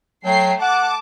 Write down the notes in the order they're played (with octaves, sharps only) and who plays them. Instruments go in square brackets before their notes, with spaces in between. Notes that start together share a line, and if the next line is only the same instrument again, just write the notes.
[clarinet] F#3 [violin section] A3 G5 C7
[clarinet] F#5 [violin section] A5 D6